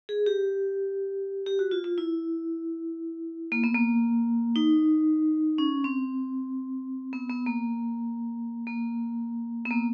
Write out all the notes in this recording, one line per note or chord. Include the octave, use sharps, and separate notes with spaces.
G#4
G4
G4
F#4
F4
F4
E4
A#3
B3
A#3
D#4
C#4
C4
B3
B3
A#3
A#3
B3
A#3